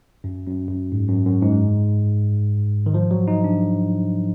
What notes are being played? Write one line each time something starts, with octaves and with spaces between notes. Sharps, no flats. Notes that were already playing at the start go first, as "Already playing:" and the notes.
F#2
F#2
F#2
G#2
F#2
F#2
G#2
D#3
F3
F#3
D#4
D4